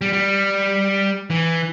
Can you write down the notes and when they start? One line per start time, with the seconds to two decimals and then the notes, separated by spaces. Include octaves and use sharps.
0.01 G3
0.13 G3
1.30 E3